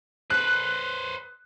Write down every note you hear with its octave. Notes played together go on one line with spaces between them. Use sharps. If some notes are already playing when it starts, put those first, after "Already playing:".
B4 C5 F#6